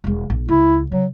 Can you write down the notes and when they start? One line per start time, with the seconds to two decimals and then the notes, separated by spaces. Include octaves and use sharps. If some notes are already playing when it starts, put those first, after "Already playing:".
0.04 E1 G#3
0.30 A#1
0.48 C#2 E4
0.92 C#3 F#3